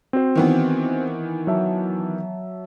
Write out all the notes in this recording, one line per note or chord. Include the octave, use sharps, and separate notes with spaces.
C4 F#4 C5
D#3 E3 B3
F#3 E5 A5